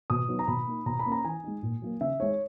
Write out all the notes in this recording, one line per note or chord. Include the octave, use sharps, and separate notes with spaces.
B2 D#6
F#3 B3 D#4
A#5
B2 B5
A#3 D#4
B2 A#5
B5
A#3 C#4
A#5
E3 G#5
G#3 D#4
A#2
F#3 A#3
C#3 E5
G#3 D#4 C#5